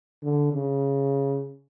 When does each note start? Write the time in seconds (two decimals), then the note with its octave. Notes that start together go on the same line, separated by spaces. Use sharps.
0.22 D3
0.52 C#3